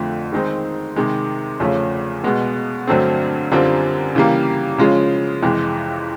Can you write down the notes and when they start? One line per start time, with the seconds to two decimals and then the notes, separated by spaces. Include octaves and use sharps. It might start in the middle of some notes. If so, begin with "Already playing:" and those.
Already playing: F2 D3 F3 A3
0.32 D#3 G#3 C4 D#4
0.96 C3 D#3 G#3
1.60 E2 C#3 F3 A3 C#4
2.24 B2 G#3 B3
2.87 G2 D3 F#3 A3 C4
3.52 F#2 D3 G3 C4 F4
4.15 C#3 E3 G3 A#3
4.78 C#3 F3 G#3 C#4 F4
5.43 F2 C3 E3 G#3